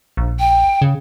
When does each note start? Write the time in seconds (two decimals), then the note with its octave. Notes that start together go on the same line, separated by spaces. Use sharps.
0.17 A#1
0.39 G5
0.82 C#3